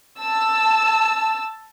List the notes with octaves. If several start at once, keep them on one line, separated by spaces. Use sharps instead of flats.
A5 E6